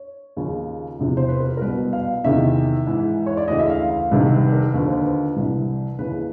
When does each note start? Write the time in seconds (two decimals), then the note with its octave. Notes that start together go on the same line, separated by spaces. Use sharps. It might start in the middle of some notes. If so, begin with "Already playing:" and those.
Already playing: C#5
0.37 D#2 C#3 F3
0.99 E2 C3 F3
1.17 C5
1.28 B4
1.40 A#4
1.57 A#4
1.61 C2 B2 B4
1.93 F5
2.24 E2 C3 D#3 E5
2.86 G#2 E3
3.27 C#5
3.37 D5
3.48 D2 C#3 E3 D#5
3.59 E5
3.70 F5
3.90 F5
4.11 C2 C3 D#3 B4
4.32 B4
4.53 A#4
4.74 D#2 D3 F3 B4
4.87 C5
5.00 B4
5.36 C2 C3 E3
5.99 D#2 C#3 E3 B4